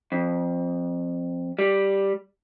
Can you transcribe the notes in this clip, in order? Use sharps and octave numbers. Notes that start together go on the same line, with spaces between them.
F2
G3